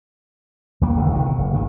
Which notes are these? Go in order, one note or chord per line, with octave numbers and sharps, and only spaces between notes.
D#2 G3 A#3
E1 D2 D3 D#3
G1 C3 D#3
B2
F#1
G#1 G2 D#3